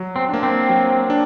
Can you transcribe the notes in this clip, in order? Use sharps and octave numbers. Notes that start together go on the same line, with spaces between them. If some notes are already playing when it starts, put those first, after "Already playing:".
Already playing: F#3
C4
A#3 D4
C4
F#3
D4